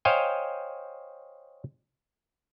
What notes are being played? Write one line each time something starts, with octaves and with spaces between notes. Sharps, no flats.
C5 C#5 D#5 F5 G5 G#5